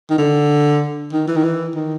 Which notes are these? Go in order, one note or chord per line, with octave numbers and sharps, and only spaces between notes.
D#3
D3
D#3
E3
D#3
E3
D#3